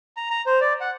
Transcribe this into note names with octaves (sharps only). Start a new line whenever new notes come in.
A#5
A#5
C5
D5
F#5